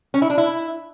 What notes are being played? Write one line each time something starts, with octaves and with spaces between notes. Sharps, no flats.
C#4
E4
D4
E4